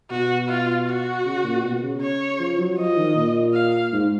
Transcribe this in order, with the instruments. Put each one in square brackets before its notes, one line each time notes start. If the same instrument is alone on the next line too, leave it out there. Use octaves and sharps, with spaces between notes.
[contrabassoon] B2 [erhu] F#4
[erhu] F4
F#4
[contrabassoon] C#3
A#2
B2
C#3
[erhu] C#5
[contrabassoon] F3
F#3
[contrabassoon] F3 [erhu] D#5
[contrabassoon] D#3
A#2
[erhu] F5
[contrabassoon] G#2